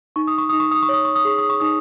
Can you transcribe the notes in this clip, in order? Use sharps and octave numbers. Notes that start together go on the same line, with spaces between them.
D#4 C#6
D#6
C#6
D#4 D#6
C#6
D#6
C#6
C#5 D#6
C#6
D#6
G#4 C#6
D#6
C#6
D#4 D#6